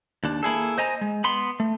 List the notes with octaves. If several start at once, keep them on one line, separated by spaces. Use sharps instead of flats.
D#2 D4
A#3 E4 G#4 A4
C5 D#5 G#5 A#5
G#3
B3 B5 C6
A3